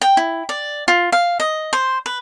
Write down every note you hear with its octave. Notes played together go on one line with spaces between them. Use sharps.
G5
E4
D5
F4
F5
D#5
C5
B4